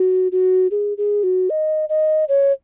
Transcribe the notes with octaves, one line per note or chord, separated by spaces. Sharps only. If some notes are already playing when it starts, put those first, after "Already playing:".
Already playing: F#4
F#4
G#4
G#4
F#4
D#5
D#5
C#5